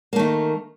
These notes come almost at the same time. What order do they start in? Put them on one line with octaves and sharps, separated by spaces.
A#3 A3 D#3